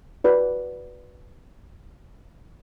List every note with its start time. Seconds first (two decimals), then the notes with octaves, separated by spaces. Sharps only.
0.24 F#4 B4 D5